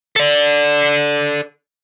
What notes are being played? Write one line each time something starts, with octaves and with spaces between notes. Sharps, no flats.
A4 D5